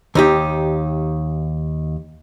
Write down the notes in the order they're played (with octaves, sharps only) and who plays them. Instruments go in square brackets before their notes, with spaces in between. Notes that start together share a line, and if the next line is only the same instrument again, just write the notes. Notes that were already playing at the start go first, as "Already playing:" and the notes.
[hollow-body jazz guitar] D#2 D#4 G4